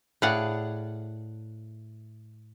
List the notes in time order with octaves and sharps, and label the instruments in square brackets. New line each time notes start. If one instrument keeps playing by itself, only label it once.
[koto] A2 G#4 D5 F5 F#5